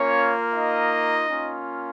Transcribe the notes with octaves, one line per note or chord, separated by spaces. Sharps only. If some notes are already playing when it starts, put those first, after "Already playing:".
Already playing: A#3 C#4 F4 C#5
D#4 D#5
A#3 C#4 F4